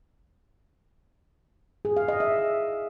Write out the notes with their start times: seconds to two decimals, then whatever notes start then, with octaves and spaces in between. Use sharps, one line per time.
1.85 G#4
1.97 F5
2.08 D#5
2.20 E5